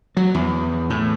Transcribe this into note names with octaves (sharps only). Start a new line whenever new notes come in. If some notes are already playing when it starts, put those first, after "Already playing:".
F#3
E2
A2